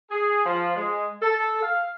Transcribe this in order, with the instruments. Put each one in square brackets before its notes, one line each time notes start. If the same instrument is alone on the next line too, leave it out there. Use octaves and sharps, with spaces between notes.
[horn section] G#4
F3
G#3
A4
F5